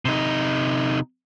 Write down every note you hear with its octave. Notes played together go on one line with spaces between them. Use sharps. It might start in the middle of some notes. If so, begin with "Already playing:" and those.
C3 D#4